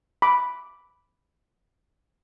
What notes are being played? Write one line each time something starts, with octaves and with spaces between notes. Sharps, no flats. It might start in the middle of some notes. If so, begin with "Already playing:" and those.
B5 D6